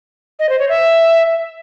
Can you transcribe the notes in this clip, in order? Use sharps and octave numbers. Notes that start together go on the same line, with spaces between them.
D#5
C5
C#5
E5